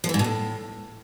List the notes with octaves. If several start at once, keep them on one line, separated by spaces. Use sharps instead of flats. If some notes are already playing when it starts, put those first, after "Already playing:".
F3
E3
G#2
B2
A2